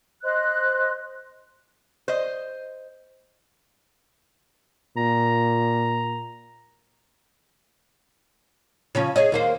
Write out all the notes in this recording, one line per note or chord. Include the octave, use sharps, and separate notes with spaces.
C5 D#5 C6 F#6
C5 D#5
A#2 A#5
C#3 F3 C#4
G#4 C#5 D#5
D#2 A#3 C5